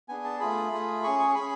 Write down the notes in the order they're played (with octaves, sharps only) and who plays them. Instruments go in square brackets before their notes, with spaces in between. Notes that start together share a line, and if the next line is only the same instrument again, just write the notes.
[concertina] B3 D4 G#4 G#5
A5
A3 F4 G#4 B5
A3 F4 G#4
C#4 G#4 C#6
C#6
C#6
C#4 G#4 B5